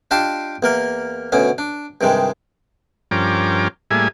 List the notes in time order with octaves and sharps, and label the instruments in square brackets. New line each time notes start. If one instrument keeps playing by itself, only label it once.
[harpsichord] D4 F4 G4 D#5 A5 C6
E2 A#3 A#4
D2 B2 C#4
D4
G2 C3 D#3 G#3
[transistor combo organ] G2 F3 C#4 A#4 G5 D6
A2 G3 A#3 G#4 E5 G#5